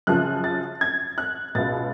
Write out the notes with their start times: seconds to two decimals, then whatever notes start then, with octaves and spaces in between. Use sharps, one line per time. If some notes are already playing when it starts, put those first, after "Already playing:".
0.07 F#2 C#3 F3 F#6
0.44 A6
0.81 G#6
1.18 F#6
1.55 C#2 B2 A6